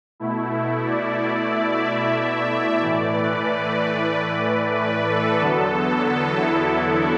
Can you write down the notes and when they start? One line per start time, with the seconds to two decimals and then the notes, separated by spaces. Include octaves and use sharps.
0.20 B2 A3 E4
0.85 D5
1.50 E5
1.83 E5
2.80 A2 E3 A3 D5
3.12 B4
4.75 B4
5.07 A4
5.40 E2 D3 F#3 B3 A4
6.37 E4